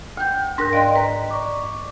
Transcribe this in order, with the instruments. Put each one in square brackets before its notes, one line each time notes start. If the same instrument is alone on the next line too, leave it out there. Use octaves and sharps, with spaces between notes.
[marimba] D2 G6 [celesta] G5
[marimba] G#2 A#6 [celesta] D4 A#4 F#6
[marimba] D5 D#5 C6 [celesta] F5 G5
[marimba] B4 [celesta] A#5 B6
[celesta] D5 C#6 D6